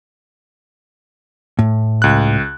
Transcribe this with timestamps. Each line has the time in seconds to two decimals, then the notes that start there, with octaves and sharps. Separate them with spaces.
1.59 A2
2.02 C#2 F#6